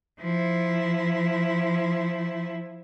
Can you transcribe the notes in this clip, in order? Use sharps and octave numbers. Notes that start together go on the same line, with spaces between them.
F3 E4